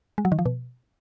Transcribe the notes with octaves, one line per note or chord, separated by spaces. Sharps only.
G#3
F#3
D#3
F3
B2